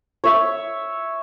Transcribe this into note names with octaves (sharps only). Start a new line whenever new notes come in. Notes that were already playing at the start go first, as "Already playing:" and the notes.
C#5 E5